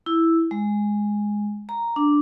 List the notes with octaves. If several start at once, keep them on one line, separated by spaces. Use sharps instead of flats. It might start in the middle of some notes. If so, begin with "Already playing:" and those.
E4
G#3
A#5
D4